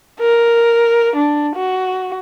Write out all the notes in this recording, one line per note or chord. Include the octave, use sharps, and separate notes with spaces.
A#4
D4
F#4